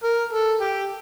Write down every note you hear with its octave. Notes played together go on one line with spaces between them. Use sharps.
A#4
A4
G4